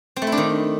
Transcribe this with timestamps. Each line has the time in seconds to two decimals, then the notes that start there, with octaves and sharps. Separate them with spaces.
0.16 C4
0.22 A3
0.27 E4
0.32 D4
0.38 D#3